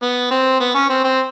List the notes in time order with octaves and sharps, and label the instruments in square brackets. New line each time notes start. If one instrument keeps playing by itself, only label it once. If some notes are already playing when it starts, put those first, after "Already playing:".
[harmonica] B3
C4
B3
C#4
C4
C4